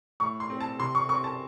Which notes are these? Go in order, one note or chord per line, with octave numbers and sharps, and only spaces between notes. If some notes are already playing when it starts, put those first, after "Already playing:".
A2 C#6
C6
C4
A5
C3 C6
C#6
C4 C#6
A5